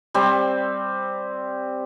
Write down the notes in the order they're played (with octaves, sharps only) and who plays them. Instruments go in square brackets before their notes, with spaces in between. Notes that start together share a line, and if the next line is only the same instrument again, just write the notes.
[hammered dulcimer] G3 C4